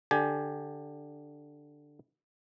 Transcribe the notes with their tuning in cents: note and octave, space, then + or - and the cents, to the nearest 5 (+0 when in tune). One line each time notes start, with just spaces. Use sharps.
D3 +5 G4 +15 G#5 +20